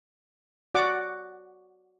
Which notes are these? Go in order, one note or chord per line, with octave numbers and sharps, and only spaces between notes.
F#4 D5 F#5 D6